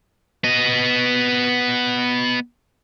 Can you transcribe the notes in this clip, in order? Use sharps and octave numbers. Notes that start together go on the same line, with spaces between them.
B3 D#5